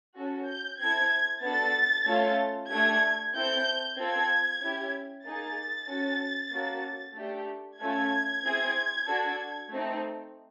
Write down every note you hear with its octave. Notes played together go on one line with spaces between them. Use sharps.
C#4 F#4 A4
G6
C4 E4 A4 G#6
B3 D4 F#4 A4 A6
A3 C#4 F4 A4
A3 D4 G4 G#6
C4 E4 A4 G6
C4 F4 A4 G#6
C#4 E4 G4
A#3 D#4 G#4 A6
C#4 F#4 A4
A#3 C#4 F#4 A4
A3 D4 G4
A3 C#4 F4 A4 G#6
C4 E4 G#4
D4 F#4 A4
A3 C4 D#4